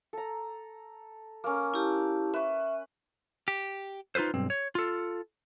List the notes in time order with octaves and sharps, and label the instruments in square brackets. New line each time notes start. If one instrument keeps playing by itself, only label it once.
[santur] A4 A#5
A#3 C#4
[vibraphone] E4 G4 A5
[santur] B4 [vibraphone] E5 C#6
[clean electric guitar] G4
D#4 F4 A4 B4 C5
B1 G2 C4
C#5
F4 A4